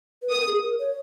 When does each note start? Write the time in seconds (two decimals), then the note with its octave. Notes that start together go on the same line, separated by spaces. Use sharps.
0.22 B4
0.30 A#4 D#6
0.47 G#4
0.63 A#4
0.80 C#5